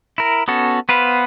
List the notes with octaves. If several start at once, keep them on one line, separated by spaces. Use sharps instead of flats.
E4 A#4
B3 C#4 F#4 A4
B3 B4 C5 F5